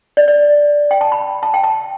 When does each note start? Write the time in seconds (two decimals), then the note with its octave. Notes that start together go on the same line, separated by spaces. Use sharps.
0.17 D5
0.28 D5
0.91 G5
1.01 A5
1.12 B5
1.43 A5
1.54 G5
1.64 A5